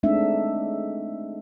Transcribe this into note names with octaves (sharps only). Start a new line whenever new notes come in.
G#3 A3 C4 D4 D#4 E5